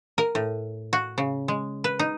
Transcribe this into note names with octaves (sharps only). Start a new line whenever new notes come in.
A#4
A2
F#4
C#3
G#3
B4
D#4